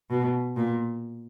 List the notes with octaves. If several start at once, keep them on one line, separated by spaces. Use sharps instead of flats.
B2
A#2